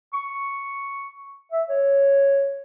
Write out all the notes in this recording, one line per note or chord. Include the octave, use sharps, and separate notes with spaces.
C#6
E5
C#5